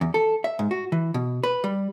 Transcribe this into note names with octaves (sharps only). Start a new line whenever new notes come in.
E2
A4
E5
G#2
F#4
E3
B2
B4
G3